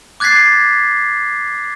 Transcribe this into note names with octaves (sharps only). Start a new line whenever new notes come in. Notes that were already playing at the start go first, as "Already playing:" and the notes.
D6 F#6 G#6 A6 B6 C7